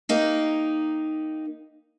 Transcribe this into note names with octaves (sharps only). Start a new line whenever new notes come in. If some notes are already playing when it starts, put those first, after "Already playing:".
A#3 D#4 G4